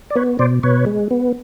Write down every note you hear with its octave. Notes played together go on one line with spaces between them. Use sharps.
D5
B3 B4 C#5
B2 C5 D5
B2 B4 C#5
G#3
B3